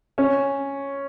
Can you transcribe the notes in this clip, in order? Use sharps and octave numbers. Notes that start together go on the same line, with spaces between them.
C#4